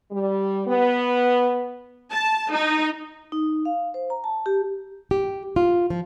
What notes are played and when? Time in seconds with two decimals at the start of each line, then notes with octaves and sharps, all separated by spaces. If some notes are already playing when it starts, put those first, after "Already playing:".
0.11 G3
0.67 B3
2.11 A5
2.52 D#4
3.32 D#4
3.65 F5
3.94 C5
4.10 A#5
4.24 A5
4.46 G4
5.11 G4
5.56 F4
5.90 F3